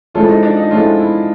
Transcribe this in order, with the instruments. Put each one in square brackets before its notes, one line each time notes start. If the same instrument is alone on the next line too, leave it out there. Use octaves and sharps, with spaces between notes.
[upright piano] F3 G#3 C#4 E4 A4 [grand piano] F4
[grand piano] D#4
D4
D#4
[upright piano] F3 G#3 C#4 E4 A4 [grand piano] F4
[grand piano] E4